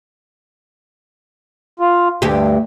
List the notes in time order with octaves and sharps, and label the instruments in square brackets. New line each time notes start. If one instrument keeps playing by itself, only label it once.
[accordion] F4
[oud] D2 G4 [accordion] G2